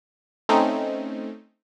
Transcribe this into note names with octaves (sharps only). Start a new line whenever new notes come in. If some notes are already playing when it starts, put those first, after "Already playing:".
A3 C4 C#4 D#4